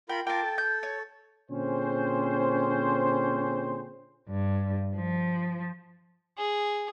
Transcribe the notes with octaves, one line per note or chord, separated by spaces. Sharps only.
F4 A#4 G5 B5
F4 A#4 G5 A5 D6
A4
G6
C#5
A#2 D3 C4 C#4 G#4 C5
G2
F3
G#4